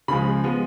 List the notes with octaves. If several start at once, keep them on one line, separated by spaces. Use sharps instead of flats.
C#2 C#3 F3 G#3 B5
F3 G#3 B3